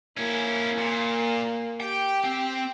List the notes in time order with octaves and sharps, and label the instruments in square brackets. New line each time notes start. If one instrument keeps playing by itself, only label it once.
[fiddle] A#3 [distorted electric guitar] C#4 E4
[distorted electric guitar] A#2
[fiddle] G4 [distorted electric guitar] G5
[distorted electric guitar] C4